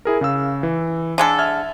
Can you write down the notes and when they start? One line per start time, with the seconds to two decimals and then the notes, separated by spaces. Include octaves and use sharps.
0.05 E4 G#4 A#4
0.21 C#3 F5 E6
0.63 E3
1.18 D3 G#3 A4
1.38 E5 F6 G#6